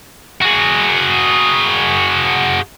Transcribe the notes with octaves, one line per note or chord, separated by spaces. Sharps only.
F#4 G#4